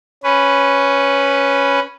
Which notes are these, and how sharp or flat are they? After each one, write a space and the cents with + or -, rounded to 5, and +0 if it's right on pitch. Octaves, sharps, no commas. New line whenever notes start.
C#4 +0 B4 +0